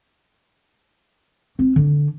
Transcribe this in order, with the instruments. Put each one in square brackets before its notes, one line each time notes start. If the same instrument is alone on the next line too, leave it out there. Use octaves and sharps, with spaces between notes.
[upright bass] C4
D3